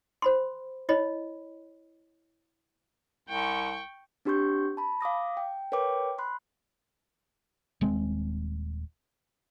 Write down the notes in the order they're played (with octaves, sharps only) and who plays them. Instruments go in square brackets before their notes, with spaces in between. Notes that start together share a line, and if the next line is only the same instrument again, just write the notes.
[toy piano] C5 B5 C6
E4 C#5 D#5 B5
[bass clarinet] C2 [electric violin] G5 C#6
[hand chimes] C4 D4 G4 C6 C#6 G6
A5 B5
F5 D6 D#6 A#6
G5
A#4 B4 C#5 G5 D6
B5 C6 F#6
[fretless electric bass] D#1 G#3 C4